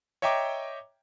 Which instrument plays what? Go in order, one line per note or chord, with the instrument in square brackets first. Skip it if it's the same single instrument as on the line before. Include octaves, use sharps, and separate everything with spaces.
[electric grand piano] C#5 D#5 E5 G5 A#5 D6